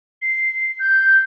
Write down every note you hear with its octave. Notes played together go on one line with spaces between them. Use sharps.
C7
G6